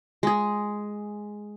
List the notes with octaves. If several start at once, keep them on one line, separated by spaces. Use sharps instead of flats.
G#3 G#4